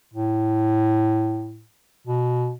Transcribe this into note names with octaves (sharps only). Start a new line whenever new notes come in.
A2
B2